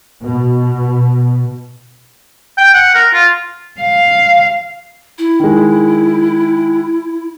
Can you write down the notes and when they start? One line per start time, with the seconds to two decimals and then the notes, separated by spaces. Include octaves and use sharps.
0.24 B2
2.58 G5
2.74 F#5
2.95 A#4
3.13 F4
3.81 F5
5.18 E4
5.40 D#3 G#3